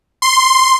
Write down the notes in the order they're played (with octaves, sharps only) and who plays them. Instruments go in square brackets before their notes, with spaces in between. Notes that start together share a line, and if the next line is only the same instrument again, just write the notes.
[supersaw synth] C6